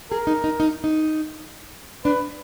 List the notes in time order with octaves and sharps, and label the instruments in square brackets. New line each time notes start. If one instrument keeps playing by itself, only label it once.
[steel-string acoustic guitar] G#4 [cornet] A#4
[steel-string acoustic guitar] D#4
D#4
D#4
D#4
[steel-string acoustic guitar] D4 [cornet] B4